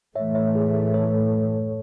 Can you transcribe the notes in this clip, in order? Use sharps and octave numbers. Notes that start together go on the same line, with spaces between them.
A2 E3 A3 C#5 E5
C#5 E5
G#4
A4 C#5